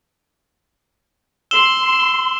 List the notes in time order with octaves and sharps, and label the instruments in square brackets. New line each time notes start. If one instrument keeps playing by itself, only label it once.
[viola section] C6 [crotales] E6 E7 G7